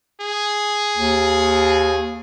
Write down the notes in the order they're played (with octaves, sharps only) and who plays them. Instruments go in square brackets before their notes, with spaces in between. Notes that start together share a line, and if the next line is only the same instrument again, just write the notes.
[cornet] G#4
[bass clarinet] D#2